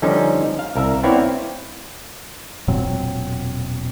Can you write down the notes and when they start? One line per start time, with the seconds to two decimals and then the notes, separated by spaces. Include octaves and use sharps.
0.02 D3 F3 G3 C#4 D#4
0.59 F5
0.76 C2 A#4 E5
1.03 B3 C4 E4 C#5 D5 F5
2.68 E1 A#2 F#3 C4